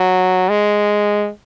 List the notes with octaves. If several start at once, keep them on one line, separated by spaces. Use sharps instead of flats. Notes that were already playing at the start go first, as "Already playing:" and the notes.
Already playing: F#3
G#3